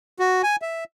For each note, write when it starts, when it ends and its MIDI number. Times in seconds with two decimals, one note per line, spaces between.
0.19 0.42 66
0.43 0.56 80
0.62 0.84 76